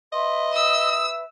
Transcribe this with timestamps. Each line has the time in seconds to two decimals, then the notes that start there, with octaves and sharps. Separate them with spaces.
0.13 B4 D#5 E5 C6
0.53 D#6 E6